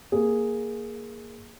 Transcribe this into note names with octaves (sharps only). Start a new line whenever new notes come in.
A#3 G#4